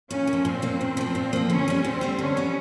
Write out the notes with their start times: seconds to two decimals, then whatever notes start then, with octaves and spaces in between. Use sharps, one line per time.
0.10 A#2 C#4
0.27 A#3
0.33 F3
0.45 A#2 C4
0.62 F3 A#3
0.81 A#2
0.97 F3 A#3
1.15 A#2
1.33 F3 A#3
1.50 D3 C#4
1.68 G3 B3
1.84 D3 C4
2.01 G3 B3
2.19 D3 C#4
2.37 G3 B3